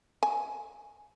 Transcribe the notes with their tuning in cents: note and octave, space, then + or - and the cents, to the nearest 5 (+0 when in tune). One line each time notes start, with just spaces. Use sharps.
G#5 -5